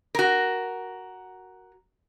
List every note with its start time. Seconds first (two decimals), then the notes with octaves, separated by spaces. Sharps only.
0.15 F#4 A#4